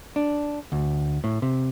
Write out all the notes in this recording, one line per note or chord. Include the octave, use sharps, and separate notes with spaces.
D4
D2
A2
C3